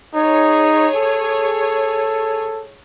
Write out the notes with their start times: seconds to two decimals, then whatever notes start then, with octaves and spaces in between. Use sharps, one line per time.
0.14 D#4 G#4 C#5
0.96 A4